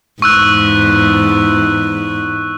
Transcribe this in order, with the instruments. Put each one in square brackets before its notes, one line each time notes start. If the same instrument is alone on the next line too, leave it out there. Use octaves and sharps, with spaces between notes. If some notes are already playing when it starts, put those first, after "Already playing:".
[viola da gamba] E2 G#2 [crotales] C#6 E6 F#6